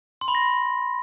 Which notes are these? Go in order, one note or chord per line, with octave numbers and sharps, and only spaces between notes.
C6
B5
A#6